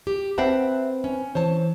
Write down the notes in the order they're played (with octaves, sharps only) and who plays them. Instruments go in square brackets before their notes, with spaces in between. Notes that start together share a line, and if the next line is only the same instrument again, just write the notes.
[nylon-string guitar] G4
[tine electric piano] C4 B4 [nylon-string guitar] E5 F#5 A5
[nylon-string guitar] C#4
[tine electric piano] E3 [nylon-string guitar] C5 C#5 A5